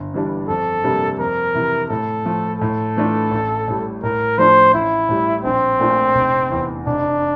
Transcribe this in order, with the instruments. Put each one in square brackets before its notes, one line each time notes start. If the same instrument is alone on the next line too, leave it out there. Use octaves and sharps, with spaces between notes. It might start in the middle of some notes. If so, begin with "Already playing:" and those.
Already playing: [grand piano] G1
G2 E3 G3 D4
[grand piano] F2 [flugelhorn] A4
[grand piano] C3 G3 A#3 D4
[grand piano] F2 [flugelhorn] A#4
[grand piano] C3 E3
[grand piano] A2 [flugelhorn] A4
[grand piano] F3 A3
[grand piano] A2 [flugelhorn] A4
[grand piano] E3 A3 D4 F4
A1
A2 G3
[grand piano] A2 [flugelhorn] A#4
[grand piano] F3 A3 D4 F4 [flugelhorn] C5
[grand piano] A1 [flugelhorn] E4
[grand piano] A2 G3
[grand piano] A#1 [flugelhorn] C4
[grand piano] A#2 A3 D4 F4
F1
E2 E3
[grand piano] F1 [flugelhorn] D4